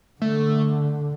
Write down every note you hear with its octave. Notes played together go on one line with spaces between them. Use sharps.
D3 A3